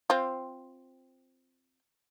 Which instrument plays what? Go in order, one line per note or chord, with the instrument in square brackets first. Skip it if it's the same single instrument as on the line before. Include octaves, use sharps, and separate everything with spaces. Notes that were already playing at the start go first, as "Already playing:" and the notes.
[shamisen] C4 F4